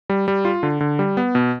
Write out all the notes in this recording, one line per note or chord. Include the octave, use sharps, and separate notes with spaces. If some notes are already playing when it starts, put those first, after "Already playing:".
G3
G3
F4
D3
D3
G3
B3
B2